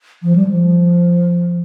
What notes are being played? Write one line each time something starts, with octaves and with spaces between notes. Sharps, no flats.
F3
G3
F3